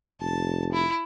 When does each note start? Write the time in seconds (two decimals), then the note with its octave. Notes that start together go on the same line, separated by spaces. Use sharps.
0.21 F1 A5
0.73 E4